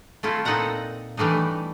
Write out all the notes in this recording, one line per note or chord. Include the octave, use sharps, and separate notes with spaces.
A3 C4 E4 F4 A4
A#2 C4 D#4 A4 F#5 A#5
E3 G3 A3 D4 D#4